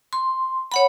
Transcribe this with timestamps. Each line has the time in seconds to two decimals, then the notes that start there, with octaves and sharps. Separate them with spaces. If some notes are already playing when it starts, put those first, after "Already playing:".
0.13 C6
0.72 C#5 F#5 B5